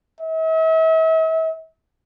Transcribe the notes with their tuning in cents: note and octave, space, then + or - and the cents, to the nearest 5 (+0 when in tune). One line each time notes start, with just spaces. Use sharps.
E5 -40